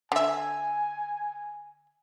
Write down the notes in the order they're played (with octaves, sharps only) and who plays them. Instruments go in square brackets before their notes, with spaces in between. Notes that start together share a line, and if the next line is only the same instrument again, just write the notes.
[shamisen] D3 E5 [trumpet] G#5